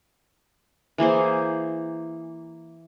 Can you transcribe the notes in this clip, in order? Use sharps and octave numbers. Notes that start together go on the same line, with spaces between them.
E3 A#3 G#4 C5